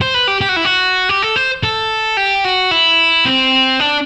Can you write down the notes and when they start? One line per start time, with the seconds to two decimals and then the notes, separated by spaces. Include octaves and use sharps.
0.01 C5
0.14 B4
0.28 G4
0.41 G4
0.49 F#4
0.56 E4
0.65 F#4
1.09 G4
1.22 A4
1.36 C5
1.63 A4
2.17 G4
2.44 F#4
2.71 E4
3.25 C4
3.80 D4